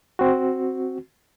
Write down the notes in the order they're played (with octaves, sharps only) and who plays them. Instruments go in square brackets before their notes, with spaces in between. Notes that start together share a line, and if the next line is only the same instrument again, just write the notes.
[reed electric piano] C4 F#4